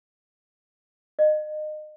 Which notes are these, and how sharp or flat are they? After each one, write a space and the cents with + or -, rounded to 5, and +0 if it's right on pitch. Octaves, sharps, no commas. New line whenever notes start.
D#5 -30